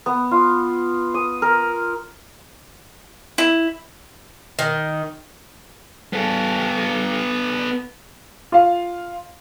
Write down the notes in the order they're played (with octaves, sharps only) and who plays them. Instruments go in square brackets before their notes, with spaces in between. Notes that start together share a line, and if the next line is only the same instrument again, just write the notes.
[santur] B3
F4
D#6
A#4
[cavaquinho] E4
[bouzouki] D#3
[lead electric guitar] B3 A4
[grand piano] F4 F5